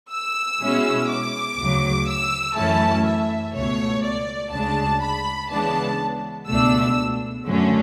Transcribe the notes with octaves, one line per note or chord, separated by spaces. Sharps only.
E6
B2 G#3 C#4 E4
D6
D2 C#3 F#3
E6
F#2 E3 A3 C#4 E4 A5
E5
C#2 B2 A3 C#5
D5
D2 C#3 G#3 D4 A5
B5
C#3 E3 G#3 B3 D4 A5
C#2 B2 A3 D4 E6
F#2 D3 F#3 A3 C#4